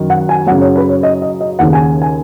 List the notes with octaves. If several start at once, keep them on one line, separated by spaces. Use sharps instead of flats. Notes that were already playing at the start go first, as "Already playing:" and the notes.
Already playing: F#2 D#3
F#5
G#5
F#2 C#3 F#5
C#5
B4
C#5
D#5
D#5
D#5
D#2 C#3 F#5
G#5
G#5